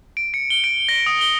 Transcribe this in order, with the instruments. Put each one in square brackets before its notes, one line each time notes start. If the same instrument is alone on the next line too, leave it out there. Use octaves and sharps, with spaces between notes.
[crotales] D7
C#7
G7
D7
A#6
D#6
G7